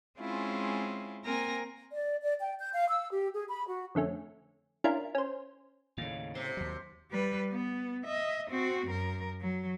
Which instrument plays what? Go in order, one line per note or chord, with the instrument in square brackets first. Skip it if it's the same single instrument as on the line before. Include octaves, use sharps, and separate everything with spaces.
[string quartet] G#3 C4 C#4 E4 F4
A#3 C4 A#4 G#5 A#5 A#6
[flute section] D5
D5
G5
G6
F5
E6
G4
G#4
B5
F#4
[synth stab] F2 D3 A3 C#4
C#4 D4 E4 F4 A#4
C#4 C5
[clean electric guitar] D#2 F5 [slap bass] A2 C#3
[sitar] C3 [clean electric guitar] C4 C5
[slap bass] D#2 F#3
[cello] G3 B4
B3
D#5 E5
C4 F#4
F#2 A#4
F#3